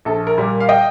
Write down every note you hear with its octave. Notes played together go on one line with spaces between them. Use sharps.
A#1 A4
A#4
A#2 G3 A#3
F5
D#5 G5